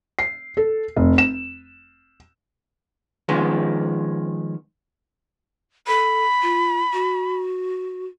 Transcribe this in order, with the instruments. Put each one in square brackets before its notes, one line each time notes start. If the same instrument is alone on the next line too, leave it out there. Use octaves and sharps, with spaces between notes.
[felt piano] C7
A4
F1
E7
[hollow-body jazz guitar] D#3 F3 G#3 B3 C#4
[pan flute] A4 [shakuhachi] B5
[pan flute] F4
F#4